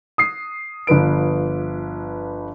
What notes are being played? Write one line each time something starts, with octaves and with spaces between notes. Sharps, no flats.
D#6 C7
G1 F3 B4 D7